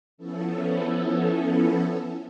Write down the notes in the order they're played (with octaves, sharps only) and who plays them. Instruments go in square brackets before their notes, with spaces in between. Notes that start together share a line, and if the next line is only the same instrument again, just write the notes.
[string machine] F3 B3 C#4 E4 A4